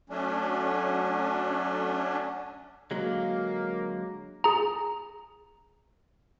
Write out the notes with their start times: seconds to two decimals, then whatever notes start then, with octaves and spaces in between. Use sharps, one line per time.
0.10 F#3 A3 C#4 D4
2.91 D3 F#3 G#3 A#3
4.44 G#4 A#5